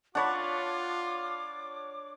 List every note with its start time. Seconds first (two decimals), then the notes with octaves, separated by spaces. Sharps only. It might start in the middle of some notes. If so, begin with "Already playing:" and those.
0.15 D4 F4 C#5 F#5 A5 B5 D6